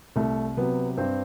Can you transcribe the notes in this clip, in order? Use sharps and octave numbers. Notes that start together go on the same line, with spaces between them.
C2 A3
C3 F#3 B3
G2 C4